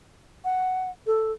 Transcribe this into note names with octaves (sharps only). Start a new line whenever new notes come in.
F#5
A4